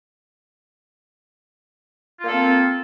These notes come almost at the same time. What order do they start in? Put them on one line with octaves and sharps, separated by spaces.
F4 A#3 A4 C4